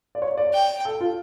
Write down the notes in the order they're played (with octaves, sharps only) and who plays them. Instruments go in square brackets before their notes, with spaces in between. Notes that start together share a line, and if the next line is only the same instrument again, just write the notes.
[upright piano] D5
C#5
D5
[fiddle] G5
[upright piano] A4
F4